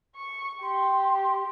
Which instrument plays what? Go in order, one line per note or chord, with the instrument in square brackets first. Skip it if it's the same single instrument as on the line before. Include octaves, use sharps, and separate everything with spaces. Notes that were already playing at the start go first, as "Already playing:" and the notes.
[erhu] C#6
[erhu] G4 [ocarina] C6